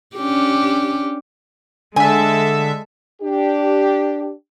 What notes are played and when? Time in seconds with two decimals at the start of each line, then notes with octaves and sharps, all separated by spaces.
0.16 C#4 D4 G4
1.96 D3 G#3 A4 E5 G#5
3.22 D4 G4